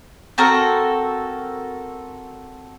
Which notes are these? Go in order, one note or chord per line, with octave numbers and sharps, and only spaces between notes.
C4 F#4 A4 A#4